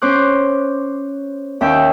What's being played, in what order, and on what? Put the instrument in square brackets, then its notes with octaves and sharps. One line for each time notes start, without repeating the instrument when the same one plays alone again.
[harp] C#4 C5 D6 F#6
D#2 C#4 E5 G5